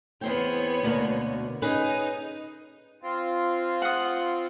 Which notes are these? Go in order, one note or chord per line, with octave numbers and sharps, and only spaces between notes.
E2 B3 C4 C#5 G5
D2 B2 A#3
C#4 D#4 G#4 B4
C4 F4
F#5 D#6